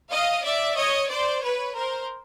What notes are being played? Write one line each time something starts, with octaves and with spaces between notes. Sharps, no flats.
D#5 F5
D5 E5
C#5 D#5
C5 D5
B4 C#5
A#4 C5